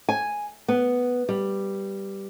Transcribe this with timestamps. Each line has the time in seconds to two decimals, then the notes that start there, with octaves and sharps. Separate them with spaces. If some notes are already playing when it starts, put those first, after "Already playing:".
0.09 G#5
0.68 B3
1.29 G3